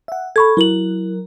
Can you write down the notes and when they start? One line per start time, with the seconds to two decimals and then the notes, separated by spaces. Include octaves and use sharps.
0.08 E5 F#5
0.36 A4 B5 C#6 G#6
0.57 F#3 E4 A#4 F#7